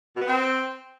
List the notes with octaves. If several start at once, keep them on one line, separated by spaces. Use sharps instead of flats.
B2
B3
C4